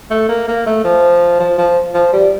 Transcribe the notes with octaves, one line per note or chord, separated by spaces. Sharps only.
A3
A#3
A#3
A3
F3
F3
F3
F3
G3